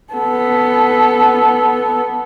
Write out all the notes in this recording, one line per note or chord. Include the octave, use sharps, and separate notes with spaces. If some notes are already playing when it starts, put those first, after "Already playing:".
B3 A4